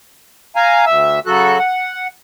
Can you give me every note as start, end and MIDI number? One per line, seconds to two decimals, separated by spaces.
0.56 0.85 77
0.56 0.85 80
0.56 0.85 82
0.86 1.20 38
0.86 1.20 76
0.86 1.20 88
1.26 1.59 49
1.26 1.59 54
1.26 1.59 66
1.26 1.59 69
1.26 1.59 90
1.59 2.07 78